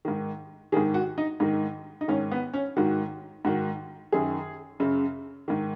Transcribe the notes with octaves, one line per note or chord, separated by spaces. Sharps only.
G#2 D#3
G#2 D#3 G#4
F#4
D#4
G#2 D#3 D#4
D#4
G#2 D#3 C#4
B3
C#4
G#2 D#3 F#4
G#2 D#3 F#4
F#2 D#3 G#4
F#2 C#3
G#2 D#3